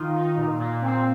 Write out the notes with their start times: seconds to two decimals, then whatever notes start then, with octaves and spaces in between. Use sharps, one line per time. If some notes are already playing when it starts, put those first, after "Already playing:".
Already playing: D#3 D#4 F4
0.15 D#4
0.37 A#2
0.59 A#2
0.82 C4